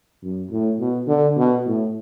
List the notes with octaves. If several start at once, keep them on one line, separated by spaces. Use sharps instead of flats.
F#2
A2
B2
D3
B2
A2